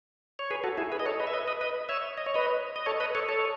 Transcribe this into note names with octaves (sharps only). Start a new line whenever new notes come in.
C#5
G#4 B4
F#4 A4
E4 G#4
G#4 B4
D#5
A4 C#5
B4 D#5
E5
B4 D#5
B4 D#5
B4 D#5
C#5 E5
D#5
C#5
B4 D#5
D#5
A4 C#5
B4 D#5
A4 C#5
A4 C#5